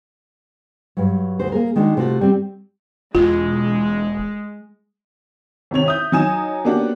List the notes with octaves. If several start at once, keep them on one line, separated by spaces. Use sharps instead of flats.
G2 F#3
D2 F#4 C5
A#3 G#4 A#4
D#3 G#3 D4 F#4
C3 A3 F4 F#4
G3 C4
E1 G#3 F4
G#1 C3 C#5 F7
E5 D#6 G6
F#3 D#4 G#5 D#6 E7
A#3 B3 C#4 D4 F#4 G4